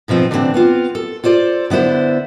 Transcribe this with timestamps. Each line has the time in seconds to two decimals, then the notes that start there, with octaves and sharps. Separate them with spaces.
0.08 G#2 B2 F3 C4
0.31 D3 E3 G3 A#3 C4 D4
0.54 B3 C4 F4
0.95 A4
1.24 F4 A4 C5 D5
1.70 D3 B3 E4 C5 D5